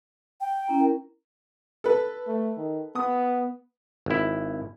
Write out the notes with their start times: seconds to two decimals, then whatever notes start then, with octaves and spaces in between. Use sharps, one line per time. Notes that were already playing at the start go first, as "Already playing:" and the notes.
0.41 G5
0.68 C#4 E4 A#5
0.80 A#4
1.84 A4 B4
2.27 A3
2.57 D#3
2.95 B3 D#6
4.06 G#1 E4